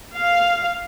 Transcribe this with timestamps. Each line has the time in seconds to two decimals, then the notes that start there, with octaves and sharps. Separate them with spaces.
0.15 F5